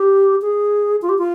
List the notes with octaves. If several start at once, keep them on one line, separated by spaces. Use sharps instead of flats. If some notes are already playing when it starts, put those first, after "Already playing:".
Already playing: G4
G#4
F4
G4
F4